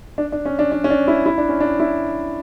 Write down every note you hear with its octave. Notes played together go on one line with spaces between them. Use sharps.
D4
D4
C#4
D4
D4
C#4
D4
E4
E4
D4
C#4
D4
E4